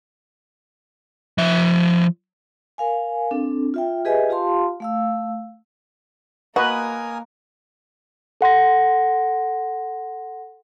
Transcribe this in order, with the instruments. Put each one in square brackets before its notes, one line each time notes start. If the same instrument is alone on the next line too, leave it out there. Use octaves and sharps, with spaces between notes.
[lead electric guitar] F3 E5
[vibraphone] A#4 F5 G#5
C4 D4 A4
F4 E5 G5
G4 G#4 B4 D#5 E5 G#5
F4 G4 F5 A5 C6
A3 F5 E6
[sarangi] A#3 [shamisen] F#4 [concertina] A#4 G#5 D#6 [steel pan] B4 D#5
[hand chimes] A4 F#5 C6 A#6